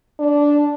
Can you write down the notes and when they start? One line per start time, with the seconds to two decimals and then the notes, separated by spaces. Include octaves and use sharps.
0.19 D4